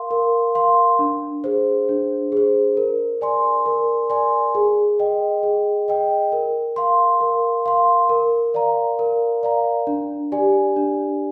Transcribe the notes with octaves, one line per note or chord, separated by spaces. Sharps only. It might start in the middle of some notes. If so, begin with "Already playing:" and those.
Already playing: A#4 F5 C6
A#4
F5 C6
D4
G#4 C5
D4
G#4 C5
A#4
D5 G#5 C6
A#4
D5 G#5 C6
G#4
D#5 G5
G#4
D#5 G5
A#4
F5 C6
A#4
F5 C6
A#4
D5 F5 A#5
A#4
D5 F5 A#5
D4
G4 D5 G#5
D4